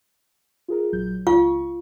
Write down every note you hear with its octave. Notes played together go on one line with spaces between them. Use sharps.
F4 G#4 A#4
A#1 F#3 G6
C#2 F4 F5 C#6